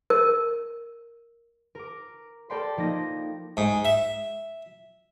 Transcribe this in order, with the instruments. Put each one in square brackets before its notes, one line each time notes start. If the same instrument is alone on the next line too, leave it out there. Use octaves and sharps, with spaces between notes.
[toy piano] A#4
[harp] A#4 D6
A4 A#4 D5 G5 B5 C6
F3 A#3 D#4 A#6
[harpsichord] G#2
E5